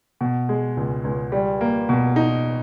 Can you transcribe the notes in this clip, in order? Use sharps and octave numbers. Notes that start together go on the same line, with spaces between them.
B2
G#3
C#2
C#2
G3
A#3
B2
D#4